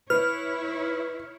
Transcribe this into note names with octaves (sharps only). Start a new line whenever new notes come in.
E4 B4 C#5 F6